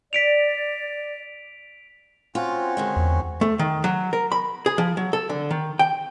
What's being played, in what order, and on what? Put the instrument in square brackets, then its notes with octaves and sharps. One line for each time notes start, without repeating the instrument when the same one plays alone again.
[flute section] D5 [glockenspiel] B6 D7 F7
[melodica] C4 C#4 F#4 [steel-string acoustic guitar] F4
[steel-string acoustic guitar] D3 D#3 G#3
[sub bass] E2
[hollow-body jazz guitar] A3
D#3
F#3
A#4
B5
G#4
F3
F#3
A4
D3
D#3
G5